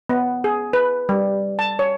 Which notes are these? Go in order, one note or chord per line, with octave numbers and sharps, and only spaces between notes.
B3
G#4
B4
G3
A5
C#5